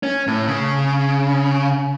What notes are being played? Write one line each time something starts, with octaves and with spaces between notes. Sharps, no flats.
C#4
A2
C#3